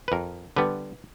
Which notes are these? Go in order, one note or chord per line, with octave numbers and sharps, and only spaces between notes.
B4
F2 A#4
D3 G3 B3 B4